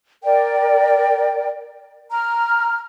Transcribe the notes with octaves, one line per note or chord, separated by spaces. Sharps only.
A#4 D5 G5
A#5 F6